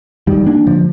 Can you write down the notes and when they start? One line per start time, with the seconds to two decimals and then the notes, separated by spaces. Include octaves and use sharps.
0.27 G#2 D#3 G3
0.46 A#3 D4
0.66 G#2 D3 F3